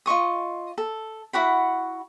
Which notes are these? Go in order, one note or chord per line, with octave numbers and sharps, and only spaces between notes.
F4 D#5 C#6 D#6
A4
E4 F#4 F#5 B5